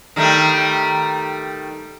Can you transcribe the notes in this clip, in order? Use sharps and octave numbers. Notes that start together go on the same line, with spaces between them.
D#3 G3 A3